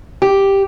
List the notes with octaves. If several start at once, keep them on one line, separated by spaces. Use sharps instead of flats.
G4